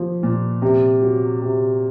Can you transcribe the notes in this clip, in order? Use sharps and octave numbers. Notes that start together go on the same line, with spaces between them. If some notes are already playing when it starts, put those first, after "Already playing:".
Already playing: F3 A#3
A#2
C3
F#3
C3